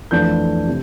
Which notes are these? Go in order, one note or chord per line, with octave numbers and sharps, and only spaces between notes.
F2 E3 A3 D4 G6
C3